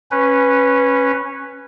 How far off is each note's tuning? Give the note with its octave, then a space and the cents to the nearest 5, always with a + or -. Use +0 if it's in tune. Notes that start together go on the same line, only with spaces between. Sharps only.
C#4 -10 B4 +0